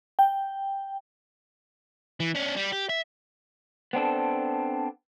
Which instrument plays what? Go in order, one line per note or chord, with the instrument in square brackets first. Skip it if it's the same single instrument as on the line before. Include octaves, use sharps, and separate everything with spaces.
[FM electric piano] G5
[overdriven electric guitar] E3
C#4 D4
G3
G4
E5
[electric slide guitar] B3 C4 D4 A4